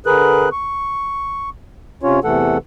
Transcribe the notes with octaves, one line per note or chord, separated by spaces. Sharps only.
D3 G#4 A#4 B4 F#6
C#6
C3 C#4 F4 C#5
E2 C3 E3 A3 A4 F#5